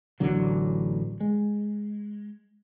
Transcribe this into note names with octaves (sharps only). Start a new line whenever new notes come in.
A1 D3 F#3
G#3